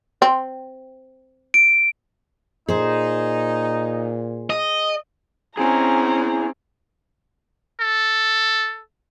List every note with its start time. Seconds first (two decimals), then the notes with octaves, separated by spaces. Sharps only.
0.22 C4
1.54 D7
2.68 A#2 D#4 G#4 C5
4.50 D#5
5.57 C4 C#4 E4 G#4 A#5
7.80 A4